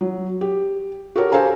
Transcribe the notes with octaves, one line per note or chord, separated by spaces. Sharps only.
F#3
G4
F#4 G4 A4 A#4 C#5
G4 A4 C5 F5 G#5 A#5